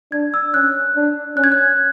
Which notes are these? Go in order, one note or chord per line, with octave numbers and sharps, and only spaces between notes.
D4 G#6
E6
C#4 F#6
D4
C#4 F#6
G#6
F#6